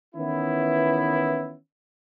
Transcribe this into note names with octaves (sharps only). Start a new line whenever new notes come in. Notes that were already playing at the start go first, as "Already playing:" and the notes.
D#3 E3 B3 C#4 E4